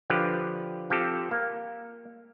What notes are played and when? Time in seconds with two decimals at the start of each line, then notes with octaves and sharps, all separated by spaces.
0.10 D3 F3 G4 B4
0.90 F3 C4 G4 A4
1.31 A#3